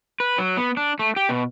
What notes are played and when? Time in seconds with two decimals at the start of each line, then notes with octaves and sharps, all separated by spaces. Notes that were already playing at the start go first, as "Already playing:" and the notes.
0.20 B4
0.38 F#3
0.57 B3
0.77 D4
0.99 A3
1.16 G4
1.29 B2